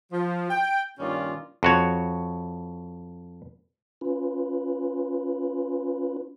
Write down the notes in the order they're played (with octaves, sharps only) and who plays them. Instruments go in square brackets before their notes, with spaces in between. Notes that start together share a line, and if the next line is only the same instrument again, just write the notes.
[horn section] F3
G5
G2 A#2 D#3 C#4 F4 D5
[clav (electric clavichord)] F2 F#4 C#5
[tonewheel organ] C#4 F4 B4